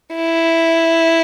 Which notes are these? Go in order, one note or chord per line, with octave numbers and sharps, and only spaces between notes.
E4